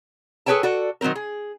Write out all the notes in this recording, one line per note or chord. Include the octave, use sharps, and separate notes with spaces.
G#4 A4 B4 C#5 G5 A5
F#4 A4 D5
D#3 F#3 A#3 C4 A#4
G#4